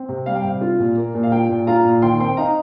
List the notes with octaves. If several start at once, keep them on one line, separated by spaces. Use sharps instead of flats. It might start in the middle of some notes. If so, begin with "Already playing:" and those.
Already playing: C4
C3
G3 F5
G5
C3 F5
F4
A#2
A#3
A#2
F5
F4 G5
A#2
F4 F5 A#5
A#2
D#3 G5 C6
C4 G5 C6
D#4 F5 A#5